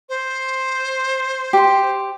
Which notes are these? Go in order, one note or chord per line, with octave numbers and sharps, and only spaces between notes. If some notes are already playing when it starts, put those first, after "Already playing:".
C5
G4 C6